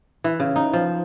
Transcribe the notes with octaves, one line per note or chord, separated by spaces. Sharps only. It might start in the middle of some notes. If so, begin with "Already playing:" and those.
E3
C#3
D#4
F3